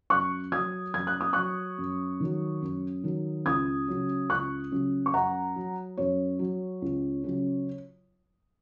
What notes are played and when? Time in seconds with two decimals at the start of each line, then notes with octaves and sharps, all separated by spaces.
0.10 F#2 C#6 F#6
0.52 F#3 D#6 G#6
0.94 F#2 G#6
1.07 F#6
1.21 D#6
1.33 F#3 C#6 F#6
1.78 F#2
2.20 D#3 F#3
2.62 F#2
3.04 D#3 F#3
3.46 C#2 D#6 G#6
3.88 C#3 F#3
4.30 C#2 C#6 F#6
4.72 C#3 F#3
5.06 C#6
5.13 F#2 F#5 A#5
5.56 F#3
5.97 F#2 C#5
6.39 F#3
6.82 C#2
7.24 C#3 F#3